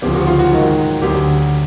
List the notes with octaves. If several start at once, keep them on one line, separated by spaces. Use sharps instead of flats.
D2 C#3 F3 G4
F#4
F4
F#4
G#2 D#3 F#3
D2 D3 F#3 G4